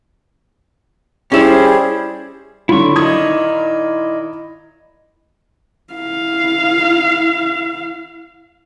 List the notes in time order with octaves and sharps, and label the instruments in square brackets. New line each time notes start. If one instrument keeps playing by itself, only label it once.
[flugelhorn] G3 [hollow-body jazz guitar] C#4 E4 [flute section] G#4 C5
[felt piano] D3 F#3 F4 [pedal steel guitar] E4 C#6
[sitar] A#2 D#3 [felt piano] B5 D#6 G#6
[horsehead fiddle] E4 F5